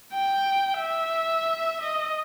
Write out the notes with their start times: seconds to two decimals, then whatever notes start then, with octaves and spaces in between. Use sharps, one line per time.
0.14 G5
0.79 E5
1.82 D#5